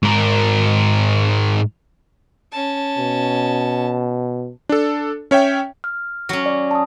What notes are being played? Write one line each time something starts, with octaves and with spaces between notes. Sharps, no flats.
G#2 A#4
C#4 A5
B2
D4 A4
C#4 C#5 E5 G5
F6
F#3 C#4
D5
A5 D#6